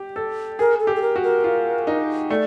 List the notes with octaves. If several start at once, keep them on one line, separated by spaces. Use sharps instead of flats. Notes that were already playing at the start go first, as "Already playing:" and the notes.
Already playing: G4
A4
G#4 A#4
A4
G4
A4
A#4
F#4
A#4
F4
D#4
A3 D5